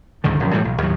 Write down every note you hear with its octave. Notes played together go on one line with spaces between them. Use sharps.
C#2 G#2 D3 D#3
A#1 F#2
A2 E3 F3 G3
B1
D#2 A2 F#3